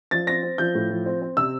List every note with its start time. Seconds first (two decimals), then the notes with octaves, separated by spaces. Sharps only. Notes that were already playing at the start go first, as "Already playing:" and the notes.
0.11 F3 A6
0.27 C4 A#6
0.43 C4
0.58 F3 G6
0.75 A2
0.90 F3
1.06 C4
1.22 C4
1.37 C3 E6